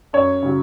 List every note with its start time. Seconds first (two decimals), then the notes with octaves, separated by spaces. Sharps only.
0.13 F#2 C#5
0.43 C#3 F#3